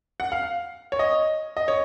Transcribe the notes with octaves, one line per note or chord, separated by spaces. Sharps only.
F#5
F5
C#5
D#5
D#5
C#5